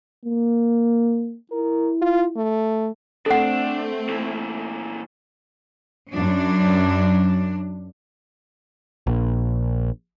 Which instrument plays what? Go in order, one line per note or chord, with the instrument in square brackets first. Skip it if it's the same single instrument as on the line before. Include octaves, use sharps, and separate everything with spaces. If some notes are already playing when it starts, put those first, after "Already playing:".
[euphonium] A#3
[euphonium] E4 [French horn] A#4
[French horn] F4
A3
[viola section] A3 C4 [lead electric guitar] D4 [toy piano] A4 F#5
[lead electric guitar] A#2 E3
[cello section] F#2 D4
[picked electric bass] A#1